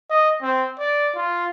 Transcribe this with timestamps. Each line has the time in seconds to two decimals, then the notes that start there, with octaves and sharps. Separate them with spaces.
0.10 D#5
0.42 C4
0.79 D5
1.16 F4